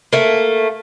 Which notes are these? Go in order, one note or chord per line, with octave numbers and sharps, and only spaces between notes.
A3 A#3